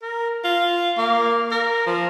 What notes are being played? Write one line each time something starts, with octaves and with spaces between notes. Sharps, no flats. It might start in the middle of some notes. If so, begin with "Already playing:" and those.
A#4
F4
A#3
A#4
F3